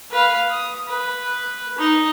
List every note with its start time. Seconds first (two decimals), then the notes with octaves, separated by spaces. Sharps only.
0.11 B4 F5
0.51 D#6
0.88 B4
1.78 D#4